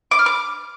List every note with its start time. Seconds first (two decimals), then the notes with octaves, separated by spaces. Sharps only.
0.11 D6
0.19 F6
0.26 D6